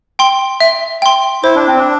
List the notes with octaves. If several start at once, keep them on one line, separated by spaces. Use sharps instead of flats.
G5 C6
E5
G5 C6
E4 C5
D4
C4
D4